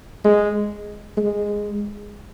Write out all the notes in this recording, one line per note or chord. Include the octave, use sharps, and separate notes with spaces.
G#3
G#3